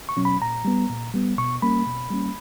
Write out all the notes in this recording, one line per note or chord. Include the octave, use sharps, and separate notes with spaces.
C#6
B2 F#3 C#4
B5
A#2 A#5
G3 B3
A#2
G3 B3
B2 C#6
G3 A#3 C#4 B5
B2
G3 A#3 C#4